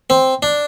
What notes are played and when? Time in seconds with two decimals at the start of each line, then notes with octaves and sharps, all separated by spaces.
0.10 C4
0.43 D4